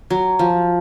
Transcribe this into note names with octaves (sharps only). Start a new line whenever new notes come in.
F#3
F3